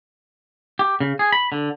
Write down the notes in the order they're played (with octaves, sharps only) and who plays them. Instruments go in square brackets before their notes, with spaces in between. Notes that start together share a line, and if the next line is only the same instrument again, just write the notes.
[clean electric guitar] G4
C#3
G#4
B5
D3